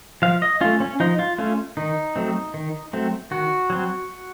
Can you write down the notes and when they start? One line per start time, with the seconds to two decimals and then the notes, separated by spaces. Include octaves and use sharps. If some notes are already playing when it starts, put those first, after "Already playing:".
0.22 F3 F5
0.42 D#5
0.61 A3 C#4 F4
0.80 C#4
1.00 F3 D#4
1.19 F4
1.38 A3 C#4 F4
1.77 D#3 D#4
2.16 F#3 A3 C4
2.54 D#3
2.93 F#3 A3 C4
3.31 D#3 F#4
3.70 F#3 C4